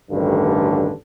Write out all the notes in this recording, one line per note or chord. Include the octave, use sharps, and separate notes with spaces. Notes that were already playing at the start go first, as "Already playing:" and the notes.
A1 D2 G2 D3 D#3